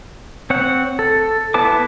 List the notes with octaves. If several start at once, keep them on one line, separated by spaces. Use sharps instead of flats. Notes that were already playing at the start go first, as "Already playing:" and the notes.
C4 C#5 F#5
A4
B3 E4 B4 A5 D6